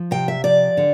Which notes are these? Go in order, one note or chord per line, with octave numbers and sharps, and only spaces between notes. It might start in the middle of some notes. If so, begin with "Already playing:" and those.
Already playing: F3
C3 G5
E5
F3 D5
D3